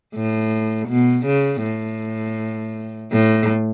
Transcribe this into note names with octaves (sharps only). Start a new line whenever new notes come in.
A2
B2
C#3
A2
A2